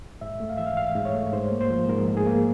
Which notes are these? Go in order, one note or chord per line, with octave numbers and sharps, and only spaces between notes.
G#2 E5
A3
F5
E3 E5
F5
G#2 F5
G#2
C#5
A3
G#2 C5
A#3
C5
F3
G#2 A#4
G#2
G#4
A#3